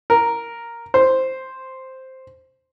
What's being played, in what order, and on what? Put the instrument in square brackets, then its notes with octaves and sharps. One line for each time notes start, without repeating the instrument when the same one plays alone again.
[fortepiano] A#4
C5